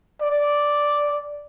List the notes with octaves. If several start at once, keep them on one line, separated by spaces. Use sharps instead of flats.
D5